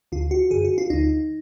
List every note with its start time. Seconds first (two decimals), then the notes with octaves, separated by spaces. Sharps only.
0.12 D2 D3 F4
0.31 F#4
0.51 F#2 D3 G#4
0.65 F#4
0.78 F4
0.90 D2 D3 D#4